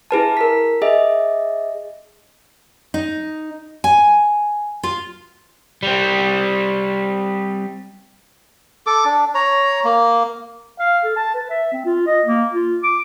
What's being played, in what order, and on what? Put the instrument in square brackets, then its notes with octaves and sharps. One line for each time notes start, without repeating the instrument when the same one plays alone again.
[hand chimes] E4 G#4 B4 A5
A#4 B6
G#4 D#5 E5
[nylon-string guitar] D#4
G#5
F4
[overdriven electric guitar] G3 C4
[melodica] A4 D6
D4
C#5 A#5
A#3
[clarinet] F5
A4
A5
B4
E5
C4
F4
D#5
A#3
F4
D6